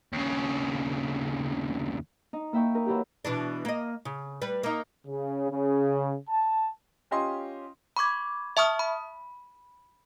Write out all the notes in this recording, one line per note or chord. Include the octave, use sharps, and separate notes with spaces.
D#2 C#3
D#4
A#3 E4 E5 G5 C#6
D#4 A#4
E3 F#3 E4 G4
B2 E3 D4
A#3 D#5
C#3
G3 B4
A#3 D#4
C#3
C#3
A5
C#4 F4 G4 D#5 G#5 C6
B5 C#6 D6 G#6
E5 A5 C#6 D#6 F6
B5